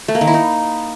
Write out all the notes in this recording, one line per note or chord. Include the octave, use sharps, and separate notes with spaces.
A3
A#3
D#3
E4
D#4